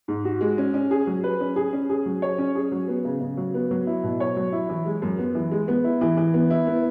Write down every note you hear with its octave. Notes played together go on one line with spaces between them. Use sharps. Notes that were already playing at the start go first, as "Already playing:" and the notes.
G#2
F#4
G#3
C#4
C#4
G#4
F#3
B4
C#4
G#4
C#4
G#4
F#3
C#5
C#4
G#4
F#3
B3
C#3
C#3
F#3
B3
F#3
E4
B2
C#5
F#3
E4
E3
G#3
F#2
B3
E3
G#3
B3
E4
E3
E3
B3
E4
B3